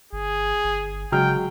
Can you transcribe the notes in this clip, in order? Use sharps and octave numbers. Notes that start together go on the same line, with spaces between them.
G1 G#4
G1
C#3 F#3 G#3 G5 F6